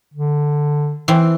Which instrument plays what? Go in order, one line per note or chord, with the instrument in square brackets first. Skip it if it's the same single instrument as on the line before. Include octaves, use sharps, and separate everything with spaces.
[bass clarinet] D3
[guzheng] E3 C4